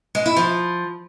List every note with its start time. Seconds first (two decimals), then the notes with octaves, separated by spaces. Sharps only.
0.15 G#3
0.26 E4
0.36 F3